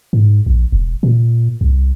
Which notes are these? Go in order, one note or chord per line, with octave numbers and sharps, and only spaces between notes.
G#2
A#1
E1
A#2
C2